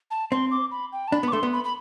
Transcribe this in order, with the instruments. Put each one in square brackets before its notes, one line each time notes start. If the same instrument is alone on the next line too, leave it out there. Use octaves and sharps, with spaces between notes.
[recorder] A5
[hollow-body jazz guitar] C4 [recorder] C6
[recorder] D6
B5
G5
A5
[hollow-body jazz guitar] D4 [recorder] B5
[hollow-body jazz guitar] B3
[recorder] D6
[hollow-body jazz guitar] A3 [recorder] C6
[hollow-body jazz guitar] B3
[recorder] B5
B5